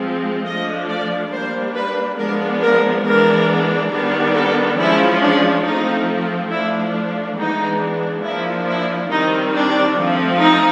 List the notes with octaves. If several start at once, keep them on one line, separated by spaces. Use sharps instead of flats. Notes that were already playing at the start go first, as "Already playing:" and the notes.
Already playing: F3 G#3 C4
F3 A3 D4 D#5
D5
G3 A#3 D4 C5
B4
F3 G#3 B3 D4 A#4
A#4
E3 G#3 B3 D4 A#4
D#3 G3 B3 D4
A4
F3 G#3 C#4 E4
D4
F3 A3 C4 D#4
F3 A3 D4 E4
E3 G#3 B3 D4 D#4
F3 A#3 D4 E4
E4
D#3 G3 C4 D#4
D4
F3 A3 C4
D#4